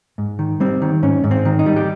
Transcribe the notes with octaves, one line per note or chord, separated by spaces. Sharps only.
G#2
D#3
G3 C4
D#3
G#2 C#4
G#2
C4
D#3
D#4
G3
G4